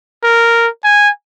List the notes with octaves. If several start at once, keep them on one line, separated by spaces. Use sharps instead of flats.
A#4
G#5